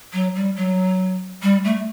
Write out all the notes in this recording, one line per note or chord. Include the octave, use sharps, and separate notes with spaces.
F#3
G3
F#3
G3
A3